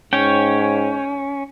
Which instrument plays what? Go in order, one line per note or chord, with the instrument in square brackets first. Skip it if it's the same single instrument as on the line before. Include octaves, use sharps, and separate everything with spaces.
[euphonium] G#2 [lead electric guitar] C#4 [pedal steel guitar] C#5 G5